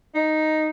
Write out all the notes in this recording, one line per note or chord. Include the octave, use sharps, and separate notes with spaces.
D#4